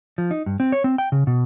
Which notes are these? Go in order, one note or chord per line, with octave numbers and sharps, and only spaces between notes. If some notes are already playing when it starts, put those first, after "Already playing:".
F3
D#4
G2
C4
C#5
C4
G5
C#3
B2